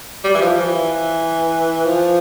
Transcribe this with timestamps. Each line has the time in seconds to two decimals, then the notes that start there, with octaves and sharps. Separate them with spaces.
0.24 G3
0.34 E3
0.41 F3
0.59 E3
1.85 F3